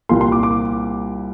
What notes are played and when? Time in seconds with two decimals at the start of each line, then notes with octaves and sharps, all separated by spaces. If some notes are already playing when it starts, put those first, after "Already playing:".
0.09 C2 A#2 G3 A#3 C6
0.21 C6
0.32 D6
0.43 D6